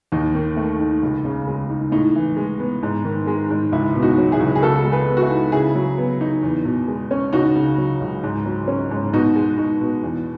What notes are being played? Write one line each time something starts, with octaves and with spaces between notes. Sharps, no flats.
D#2 D#4
D#3
A3
D#4
C#2
C#3
G#3
D#4
A2 D#4
E3
G#3
B3
G#2
D#3
G#3
G#2
C#2 E4
B2
D#4 F#4
F#3
E4 G#4
C#2
G#4
C#3 F#4 A4
G#3
G#4 B4
B3
F#4
E4
D#4
C#3 E4 G#4
F#3
B3
D#4
E2
B2
G#3
C#4
C#2 D#4 F#4
C#3
F#3
C#2
G#2
F#3
C#4
G#2
B2 D#4 F#4
G#3
D#4
B2
E2